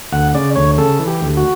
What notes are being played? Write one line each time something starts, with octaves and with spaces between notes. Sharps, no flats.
D2 F#5
C#3 D5
D2 C#5
C#3 A4
E3
G4
D2
F#4